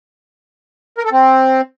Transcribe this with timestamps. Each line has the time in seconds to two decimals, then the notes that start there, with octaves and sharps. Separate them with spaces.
0.98 A#4
1.05 A4
1.12 C4